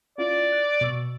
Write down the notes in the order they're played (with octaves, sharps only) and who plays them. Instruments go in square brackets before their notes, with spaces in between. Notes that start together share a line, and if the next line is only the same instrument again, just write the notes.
[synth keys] C#4 E4 F4 [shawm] D5
[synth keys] F#6
B2 C#6 E6